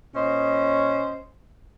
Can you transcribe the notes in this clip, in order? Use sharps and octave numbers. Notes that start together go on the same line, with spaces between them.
A#2 C#4 C5 D#5